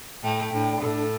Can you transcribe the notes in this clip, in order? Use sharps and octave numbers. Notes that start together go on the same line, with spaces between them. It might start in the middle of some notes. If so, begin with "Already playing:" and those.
A2 A3 G5
A2 D4
A2 A4